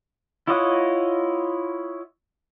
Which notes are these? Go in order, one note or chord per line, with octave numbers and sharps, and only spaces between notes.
E4 F4 C#5 D#5 F#5